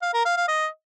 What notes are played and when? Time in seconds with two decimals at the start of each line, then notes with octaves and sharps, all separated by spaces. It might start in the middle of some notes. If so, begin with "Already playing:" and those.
0.02 F5
0.14 A#4
0.25 F5
0.37 F5
0.48 D#5